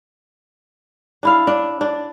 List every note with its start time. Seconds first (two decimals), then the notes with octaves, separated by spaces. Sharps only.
1.23 D4 E4 F5
1.47 D4
1.81 D4